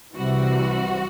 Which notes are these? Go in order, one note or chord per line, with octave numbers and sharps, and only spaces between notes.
C2 C3 E3 G3 F#4